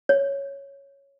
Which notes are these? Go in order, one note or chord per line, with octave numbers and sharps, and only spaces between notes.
C#5